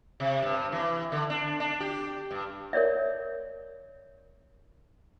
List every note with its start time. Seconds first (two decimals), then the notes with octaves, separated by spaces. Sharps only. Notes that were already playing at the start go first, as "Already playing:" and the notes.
0.20 C3
0.42 G2
0.72 E3
1.12 D3
1.30 D4
1.60 D4
1.81 G4
2.31 G2
2.73 A#4 C#5 D5 E5